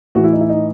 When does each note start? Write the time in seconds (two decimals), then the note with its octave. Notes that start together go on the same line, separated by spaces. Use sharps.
0.15 A2 E3 F#4
0.24 E4
0.33 D#4
0.41 E4
0.49 D#4